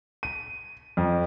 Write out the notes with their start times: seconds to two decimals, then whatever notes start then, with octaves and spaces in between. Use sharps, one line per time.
0.23 D#7
0.97 F2